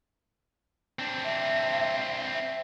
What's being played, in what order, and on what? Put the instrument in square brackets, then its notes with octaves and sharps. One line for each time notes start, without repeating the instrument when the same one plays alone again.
[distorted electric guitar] C4 D4
[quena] E5
E5